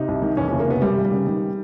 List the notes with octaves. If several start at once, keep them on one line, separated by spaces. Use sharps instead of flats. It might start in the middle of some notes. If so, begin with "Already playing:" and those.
Already playing: C3 D#4
C2
D#3
E2 C#4
F#1 C#4
A#3
C3 B3
F#2 G3
G#1
G3
C#3
D#3